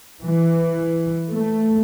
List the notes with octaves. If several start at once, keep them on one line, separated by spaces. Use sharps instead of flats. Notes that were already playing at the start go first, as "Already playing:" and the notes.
E3
A3